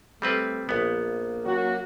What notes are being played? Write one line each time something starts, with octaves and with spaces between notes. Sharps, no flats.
G3 A3 C4 B4
A#1 A#3 B3
F#3 C#4 F#4